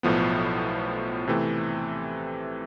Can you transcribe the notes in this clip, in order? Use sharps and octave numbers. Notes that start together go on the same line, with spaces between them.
B1 A2 F3 B3
C3 E3 A3 C4